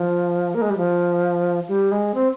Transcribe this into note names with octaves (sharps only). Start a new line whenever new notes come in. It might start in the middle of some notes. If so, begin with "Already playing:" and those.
Already playing: F3
A#3
G#3
G3
F3
G3
G#3
C4